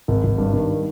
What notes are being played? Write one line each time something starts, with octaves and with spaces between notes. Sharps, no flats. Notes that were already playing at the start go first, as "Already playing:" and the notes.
G#1
G#1
G2
D#3